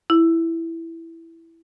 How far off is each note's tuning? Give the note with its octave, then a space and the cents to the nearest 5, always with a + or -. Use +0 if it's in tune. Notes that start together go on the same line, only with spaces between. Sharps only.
E4 +5